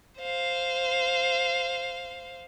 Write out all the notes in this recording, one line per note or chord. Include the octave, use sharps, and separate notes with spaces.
C5 F5